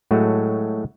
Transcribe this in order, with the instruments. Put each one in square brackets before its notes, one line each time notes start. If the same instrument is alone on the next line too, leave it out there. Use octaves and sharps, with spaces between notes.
[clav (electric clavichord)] A2 F#3 G#3 A3 F#4